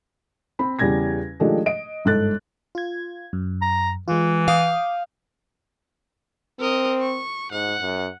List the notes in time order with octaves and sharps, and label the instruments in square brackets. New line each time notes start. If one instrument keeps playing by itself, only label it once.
[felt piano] C4 B5
E2 C#3 G3 C#4 G#6 A#6
D#3 F3 G#3 A3 D4 G4
D#5 D7
G1 G#2 A4 F#6 A6
[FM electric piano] F4 G#6
F#2
[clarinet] A#5
[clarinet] E3 [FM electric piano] G#3 F4
[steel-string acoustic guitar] F5 [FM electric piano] D6 D#6 G6
[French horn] C4 [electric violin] A#4 D#5
[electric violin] C#6
[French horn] G#2 [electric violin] F#5
[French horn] F#2